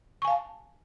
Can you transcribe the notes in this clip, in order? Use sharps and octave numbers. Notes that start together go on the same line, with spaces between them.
F5 G#5 A5 C#6